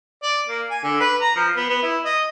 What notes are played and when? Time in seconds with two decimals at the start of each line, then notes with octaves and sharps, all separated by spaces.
0.23 D5
0.48 A#3
0.70 G#5
0.83 D3
1.00 B4
1.20 A#5
1.36 F3
1.56 B3
1.69 B3
1.82 E4
2.05 D#5